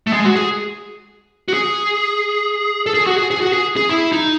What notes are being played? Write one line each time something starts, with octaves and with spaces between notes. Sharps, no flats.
A3
G#3
F#4
G#4
F#4
G#4
A4
G#4
F#4
G#4
G#4
F#4
G#4
G#4
E4
D#4